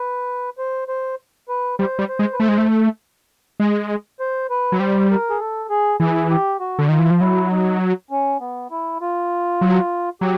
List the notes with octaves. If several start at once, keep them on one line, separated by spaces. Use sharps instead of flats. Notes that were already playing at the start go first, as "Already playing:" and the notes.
Already playing: B4
C5
C5
B4
G3 C5
G3
C5
G#3
B4
A3 C5
G#3
A3
G#3
C5
B4
F#3
G3 C5
A#4
G#4
A4
G#4
E3 G#4
G4
F#4
D3
D#3 F4
E3
F3
F#3 E4
D#4
C#4
B3
E4
F4
F#3
F#3 G4